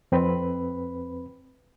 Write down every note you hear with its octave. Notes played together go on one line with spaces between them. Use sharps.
F2 C4 B4 B5